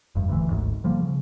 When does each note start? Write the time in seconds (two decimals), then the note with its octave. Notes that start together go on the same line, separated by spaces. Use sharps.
0.15 F1 G2
0.29 D2 E3
0.50 G#1 D2 G#2
0.84 D3 F3 G3 A#3
1.01 C#3